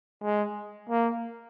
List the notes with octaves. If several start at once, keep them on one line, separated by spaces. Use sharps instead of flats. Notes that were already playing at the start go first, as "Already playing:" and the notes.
G#3
A#3